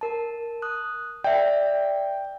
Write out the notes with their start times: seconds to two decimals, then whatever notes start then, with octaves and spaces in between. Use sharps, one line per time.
0.01 A#4 A5
0.62 D#6 F#6
1.24 D5 E5 G5